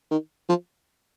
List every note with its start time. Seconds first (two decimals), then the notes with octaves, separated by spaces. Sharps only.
0.11 D#3
0.49 F3